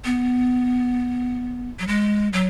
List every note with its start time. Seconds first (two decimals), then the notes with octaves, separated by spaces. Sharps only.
0.05 B3
1.79 F#3
1.88 G#3
2.33 F#3